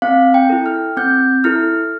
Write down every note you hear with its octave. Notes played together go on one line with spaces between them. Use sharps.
C4 F5
G5
E4 A4
F6
C4 G6
E4 A4 F6